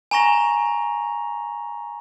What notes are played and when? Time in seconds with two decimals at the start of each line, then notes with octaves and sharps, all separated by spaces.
0.11 G#5 A#5 C#6 A#6 F7